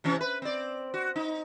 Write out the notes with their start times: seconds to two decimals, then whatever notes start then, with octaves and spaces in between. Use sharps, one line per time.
0.04 C3 E3 C#4
0.21 B4
0.42 C4 D5
0.94 F#4
1.16 D#4